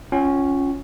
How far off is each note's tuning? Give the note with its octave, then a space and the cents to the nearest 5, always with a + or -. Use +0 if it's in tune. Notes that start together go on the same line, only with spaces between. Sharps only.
C#4 +0 F4 +0 G5 -45